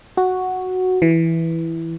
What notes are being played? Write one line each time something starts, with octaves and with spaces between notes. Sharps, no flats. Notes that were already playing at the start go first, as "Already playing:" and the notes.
F#4
E3